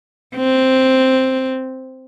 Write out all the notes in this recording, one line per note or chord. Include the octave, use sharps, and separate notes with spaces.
C4